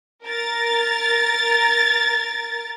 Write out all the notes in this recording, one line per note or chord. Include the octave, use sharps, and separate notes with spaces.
A#4 A6